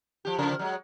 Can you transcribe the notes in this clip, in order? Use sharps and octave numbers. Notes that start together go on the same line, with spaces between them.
F3 G4
C#3 F3 A#4
F#3 G#3